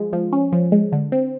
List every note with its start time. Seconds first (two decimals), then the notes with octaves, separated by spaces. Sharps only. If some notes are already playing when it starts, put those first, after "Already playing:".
Already playing: F3 G#3
0.13 F3
0.32 C#4
0.52 F3
0.72 G#3
0.92 D3
1.12 C4